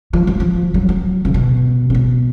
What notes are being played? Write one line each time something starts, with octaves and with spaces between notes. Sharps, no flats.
F3
F#3
F3
F#3
F#3
C#3
B2
C#3
B2